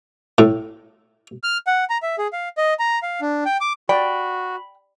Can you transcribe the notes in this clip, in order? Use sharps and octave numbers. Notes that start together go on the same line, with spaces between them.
A2
F6
F#5
A#5
E5
G#4
F5
D#5
A#5
F5
D4
G5
D6
F#4 D5 G5 B5